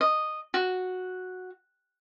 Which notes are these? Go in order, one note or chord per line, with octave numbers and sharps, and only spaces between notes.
D#5
F#4